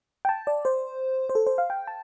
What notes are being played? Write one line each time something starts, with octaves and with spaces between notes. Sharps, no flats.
G5
A5
D5
C5
C5
A4
C5
F5
G5
A5